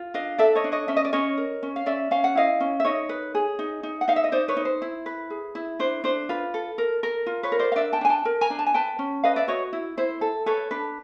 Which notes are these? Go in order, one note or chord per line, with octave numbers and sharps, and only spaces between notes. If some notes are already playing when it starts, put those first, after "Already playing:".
Already playing: F4
D4 D#5 F5
A4 D5 E5
C#5 D#5
D4
C#5 D#5
C#4 E5
D#5
D5
C#4 C#5 D#5
A#4
C#4
F5
C#4 D5 E5
C#4 F5
F#5
E4 D#5 F5
C#4
E5
D#4 C#5 D#5
B4
G#4
D#4
D#4
F#5
D#4 F5
E5
D#5
D#4 C5 D5
B4 C#5
D#4
C5
E4
B4
G#4
E4
D4 C5
D4 C5
F4 B4
A4
A#4
A#4
F4
B4 C#5
A#4
C5 D5
F5
D4 D5 E5
G5 A5
D4 G#5
G5 A5
A#4
G#5 A#5
D4
A5
G#5
B4 G5 A5
C#4
B4 D#5 F5
D5 E5
F#4 C#5 D#5
E4
E4 C5
A4
A4 B4 C#5
D4 B4